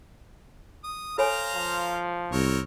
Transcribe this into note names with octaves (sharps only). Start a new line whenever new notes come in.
D#6
A4 C5 C#5 F5 G#5 A#5
F3
C2 C4 A#4 C#5